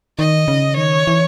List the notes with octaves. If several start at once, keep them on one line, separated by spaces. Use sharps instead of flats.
D#3 D#5
C#3
D#3 C#5
E3